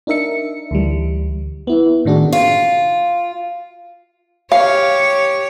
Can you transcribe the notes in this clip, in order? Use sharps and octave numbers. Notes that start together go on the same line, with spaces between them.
D4 D#4 A#4 E5 C#7
D2 E3 G3
B3 E4
A2 D#3 D4 F#4 G#4
F4
G4 C#5 F5